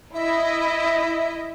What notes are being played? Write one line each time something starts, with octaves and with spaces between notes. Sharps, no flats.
E4 D#5 E5